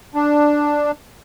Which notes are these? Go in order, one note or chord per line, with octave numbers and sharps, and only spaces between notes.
D4